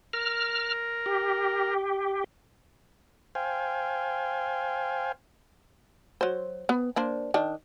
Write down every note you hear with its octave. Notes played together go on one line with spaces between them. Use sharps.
A#4 F6
G4
C5 F5 G5 G#5
F#3 C5
B3
A#3 D4 C5
D#3 D4